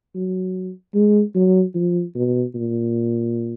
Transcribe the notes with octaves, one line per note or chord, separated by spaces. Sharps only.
F#3
G#3
F#3
F3
B2
A#2